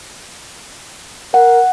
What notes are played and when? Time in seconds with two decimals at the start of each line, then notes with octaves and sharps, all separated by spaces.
1.34 A#4 F#5